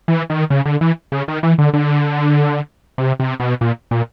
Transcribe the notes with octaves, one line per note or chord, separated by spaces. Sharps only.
E3
D#3
C#3
D3
E3
C#3
D#3
E3
D3
D3
C3
C3
B2
A#2
A#2